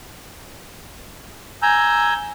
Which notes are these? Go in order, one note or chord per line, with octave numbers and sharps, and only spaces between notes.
G#5 A#5 E6 G6